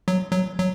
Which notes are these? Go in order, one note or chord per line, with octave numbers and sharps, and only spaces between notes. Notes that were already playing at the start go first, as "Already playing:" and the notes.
F#3
F#3
F#3